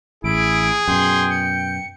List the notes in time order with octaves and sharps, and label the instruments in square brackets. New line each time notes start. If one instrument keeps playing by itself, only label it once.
[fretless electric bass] A1 [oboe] E4 [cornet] G#4 [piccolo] D7
[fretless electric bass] F#2 B2 [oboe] G5 [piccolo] C6
[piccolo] C#7